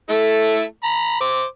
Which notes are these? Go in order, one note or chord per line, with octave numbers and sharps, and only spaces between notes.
A3 E4 A4
A#5 B5
C5 D6